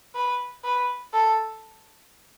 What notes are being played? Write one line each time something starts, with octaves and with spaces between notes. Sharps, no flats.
B4
B4
A4